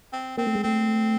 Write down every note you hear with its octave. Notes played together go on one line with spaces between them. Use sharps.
C4
A#3 C4
A3
G#3
A3 C4